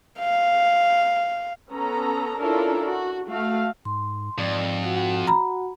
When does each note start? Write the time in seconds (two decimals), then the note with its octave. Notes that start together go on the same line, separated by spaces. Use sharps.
0.19 F5
1.71 B3 C#4 A4 A#5
2.41 C#4 D4 E4 F4 A4 A#4
2.88 F#4
3.29 A3 F#4 F5
3.85 G#2 C6
4.38 F2 G#2 D5
4.83 F#4 F#5
5.27 A#5 B5